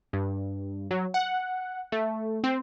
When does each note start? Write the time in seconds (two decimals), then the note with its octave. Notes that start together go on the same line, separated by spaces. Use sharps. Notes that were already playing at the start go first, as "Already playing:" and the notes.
0.13 G2
0.91 F#3
1.14 F#5
1.92 A3
2.44 C4